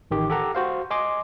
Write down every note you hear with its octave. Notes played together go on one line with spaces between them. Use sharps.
A1 D#3 G4
G4 A4 F#5 A#5
F#4 C5 F5
D#5 G#5 C6 D6